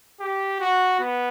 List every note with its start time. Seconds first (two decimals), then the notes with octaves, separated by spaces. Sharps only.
0.20 G4
0.60 F#4
1.00 B3